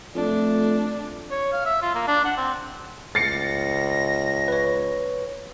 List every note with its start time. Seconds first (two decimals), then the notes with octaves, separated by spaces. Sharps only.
0.15 F2 A3 D4
1.31 C#5
1.52 F5
1.65 E5
1.82 F4
1.95 A#3
2.07 D4
2.25 F#5
2.37 C4
3.15 C#2 A6 A#6 C7 C#7
4.48 B4 C#5